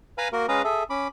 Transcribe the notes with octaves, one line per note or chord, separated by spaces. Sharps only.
B4 F5 G#5 A#5 B5 F6
A#3 F#4 A#4
G#3 C#4 G#4 B4 F5 A#5
G#4 A4 E5
C#4 B5 D6